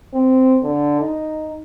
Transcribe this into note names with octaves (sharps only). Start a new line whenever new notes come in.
C4
D3
D#4